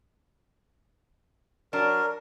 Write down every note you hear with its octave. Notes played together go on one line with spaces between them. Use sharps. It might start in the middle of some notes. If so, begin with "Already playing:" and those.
F#3 D4 A#4